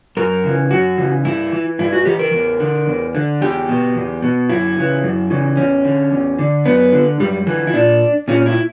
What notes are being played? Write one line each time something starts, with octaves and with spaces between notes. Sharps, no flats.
F#2 A#4
C#3 E3
F#2 F#4
C#3 E3
G2 E4
E3
G2 E4
F#4
E3 G4
A#4
E2
D3
E2
D3
E2 G4
B2
E2
B2
F#2 E4
C#3 E3
F#2
C#3 E3
E2 C#4
D3
E2
D3
F#2 B3
D3
F#2 G3
D3 E3
E4
A#2 D4
A#2 C#4
E4